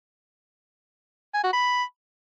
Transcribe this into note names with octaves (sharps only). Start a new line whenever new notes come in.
G#5
F#4
B5